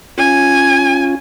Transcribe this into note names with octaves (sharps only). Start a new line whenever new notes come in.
C#4 F4 G#5